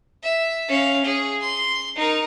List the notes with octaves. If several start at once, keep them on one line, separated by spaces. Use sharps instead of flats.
E5
C#4 F5
G#4
C6
D#4 A#4